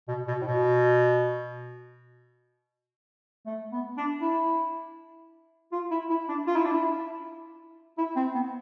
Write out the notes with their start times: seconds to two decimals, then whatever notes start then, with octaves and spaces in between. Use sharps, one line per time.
0.08 B2
0.27 B2
0.42 A2
0.46 B2
3.46 A3
3.72 B3
3.97 D4
4.21 E4
5.72 F4
5.91 E4
6.10 E4
6.29 D4
6.47 F4
6.56 E4
6.65 D4
6.73 E4
7.98 E4
8.16 C4
8.35 B3